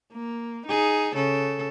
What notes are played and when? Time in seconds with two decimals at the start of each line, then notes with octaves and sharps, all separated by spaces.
0.13 A#3
0.66 D#4 G#4
1.16 C#3 A4